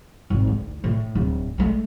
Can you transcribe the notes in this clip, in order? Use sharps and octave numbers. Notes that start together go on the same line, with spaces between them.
G#1
D2
A2
D1
G#3 A3